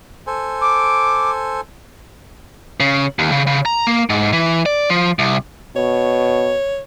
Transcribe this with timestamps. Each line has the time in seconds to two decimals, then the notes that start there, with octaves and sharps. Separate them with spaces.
0.27 A4 C5 G#5
0.61 D6
2.80 C#3
3.19 D#2
3.32 C#3
3.47 C#3
3.66 A#5
3.87 A#3
4.10 G#2
4.33 E3
4.66 D5
4.90 F3
5.19 C2
5.76 B2 C#5